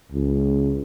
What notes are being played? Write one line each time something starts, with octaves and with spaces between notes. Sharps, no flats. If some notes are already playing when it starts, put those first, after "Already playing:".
C#2